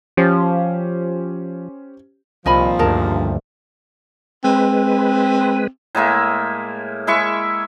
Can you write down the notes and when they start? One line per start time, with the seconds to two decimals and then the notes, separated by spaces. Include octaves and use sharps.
0.17 F3 C#4 G4 C5
2.46 C2 A#2 D#3 F3 D#5 G#5 B5
2.79 D2 G2 G#4 A#4 A5
4.44 G#3 C4 B4
5.95 A2 G#3 A#3 E5
7.07 G#3 E4 E5 C#6